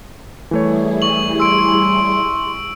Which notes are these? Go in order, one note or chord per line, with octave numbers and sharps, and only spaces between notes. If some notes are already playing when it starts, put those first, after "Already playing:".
E3 G3 A3 E4 G#4 C#5
C#6 F#7
C6 E6 D7